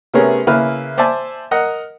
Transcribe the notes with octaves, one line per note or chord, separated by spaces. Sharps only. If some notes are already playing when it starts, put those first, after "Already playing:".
C3 A3 B3 C#4 G#4 A#4
C#3 A#3 E4 B4 F6
C5 D5 E5 G#5 A5
A#4 D#5 F#5